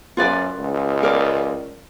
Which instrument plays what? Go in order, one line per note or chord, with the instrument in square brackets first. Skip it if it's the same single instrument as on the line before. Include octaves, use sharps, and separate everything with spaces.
[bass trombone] F#2 [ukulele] F4 B4 D5
[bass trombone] C#2
[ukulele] A#4 D5